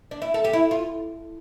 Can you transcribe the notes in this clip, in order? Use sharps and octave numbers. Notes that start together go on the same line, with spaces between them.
D4
E4
A4
G4
E4
F4